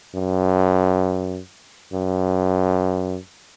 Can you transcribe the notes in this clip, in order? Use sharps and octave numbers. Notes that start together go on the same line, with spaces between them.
F#2
F#2